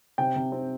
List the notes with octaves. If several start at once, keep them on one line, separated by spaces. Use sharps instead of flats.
C3 G5
C3
C4